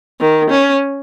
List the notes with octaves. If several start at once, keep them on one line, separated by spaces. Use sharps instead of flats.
D#3
C#4